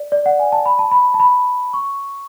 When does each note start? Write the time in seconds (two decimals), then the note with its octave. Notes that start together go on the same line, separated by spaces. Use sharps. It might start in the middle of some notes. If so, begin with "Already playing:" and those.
Already playing: D5
0.12 D5
0.26 F#5
0.39 G#5
0.52 A5
0.66 B5
0.79 A5
0.91 B5
1.14 A5
1.20 B5
1.74 C#6